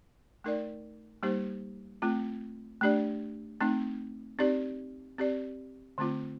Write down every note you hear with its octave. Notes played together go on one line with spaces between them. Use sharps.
A3 D#4 A#4 D5
G3 A#3 D#4 G4 C5
A3 C4 F4
A3 D4 G4 D5
A3 C4 D#4
C4 D#4 G4 D5
C4 G4 D5
D3 A3 C4 F4